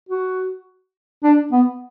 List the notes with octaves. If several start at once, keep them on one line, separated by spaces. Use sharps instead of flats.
F#4
D4
B3